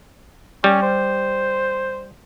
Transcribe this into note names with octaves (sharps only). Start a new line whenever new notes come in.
G3 C#4
C5